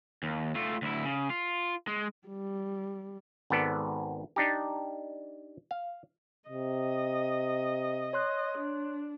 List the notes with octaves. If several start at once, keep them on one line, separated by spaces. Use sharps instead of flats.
D#2
A3 F4
D2 E4
C#3
F4
G#3
G3
G#1 G#2 B3 A4 D5
D4 D#4 G4
F5
C3 D#5
C#5 C6 F#6
D4